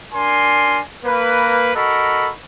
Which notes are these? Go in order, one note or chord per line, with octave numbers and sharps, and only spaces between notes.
D4 A#4 G#5 C6
A#3 B4
F#4 A4 A#4 D#5 B5